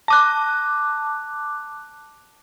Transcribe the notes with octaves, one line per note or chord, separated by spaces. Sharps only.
A5 D6 F#6